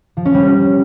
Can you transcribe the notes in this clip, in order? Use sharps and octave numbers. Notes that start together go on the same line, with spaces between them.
F3
C#4
G3